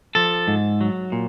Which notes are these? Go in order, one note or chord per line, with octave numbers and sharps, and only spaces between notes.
F3 A4
G#2
F#3
A#2